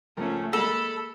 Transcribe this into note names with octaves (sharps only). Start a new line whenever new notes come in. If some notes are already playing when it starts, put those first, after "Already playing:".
C#2 F3 A3 C#4 A#4
G#3 A#3 A4 B5